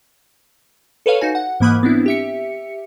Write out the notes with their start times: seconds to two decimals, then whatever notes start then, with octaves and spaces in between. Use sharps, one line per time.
1.06 A4 B4 C#5 F5
1.21 D#4 F#4 G#5
1.35 F#5
1.60 G#2 E3 A#3 B5 D#6 F#6
1.83 B3 C4 D4 E4
2.06 G4 E5 C#7